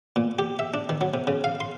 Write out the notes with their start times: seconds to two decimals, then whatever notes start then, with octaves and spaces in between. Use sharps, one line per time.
0.16 A#2
0.39 G4
0.59 E5
0.74 D4
0.89 D#3
1.01 F#3
1.14 C3
1.27 C#3
1.44 F5
1.60 C6